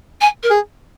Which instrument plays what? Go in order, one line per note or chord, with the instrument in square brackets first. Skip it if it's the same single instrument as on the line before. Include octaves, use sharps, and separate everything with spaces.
[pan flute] G#5
A#4
[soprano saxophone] G#4